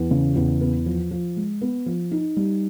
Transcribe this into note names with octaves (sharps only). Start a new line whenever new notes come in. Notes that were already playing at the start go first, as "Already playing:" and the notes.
Already playing: E2
C#3
E2
B3
F3
F3
G#3
B3
F3
D#4
G3